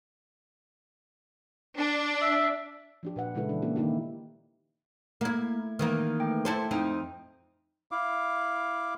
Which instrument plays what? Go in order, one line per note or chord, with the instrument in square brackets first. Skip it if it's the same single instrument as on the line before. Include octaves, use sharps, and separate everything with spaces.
[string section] D4
[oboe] E5
[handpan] F3 D4 G4
A#2 B4 F#5
A#2 C#3 G#3 E4 A4 B4
E3 D4
A#3 C#4 E4 G4
D#3 A#3 D#4 E4 G4
[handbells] A3 G#6 [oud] A#3 E4
[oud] D#3 E3 A#3
[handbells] A3 G5
[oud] E4 A4 C5
F2 C4 D#4
[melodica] E4 F5 D6